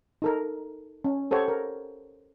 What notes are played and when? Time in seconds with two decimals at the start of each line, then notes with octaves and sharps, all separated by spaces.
0.22 D#4 A4 A#4
1.04 C#4
1.31 G4 A4 C5 C#5 F#5
1.48 A#4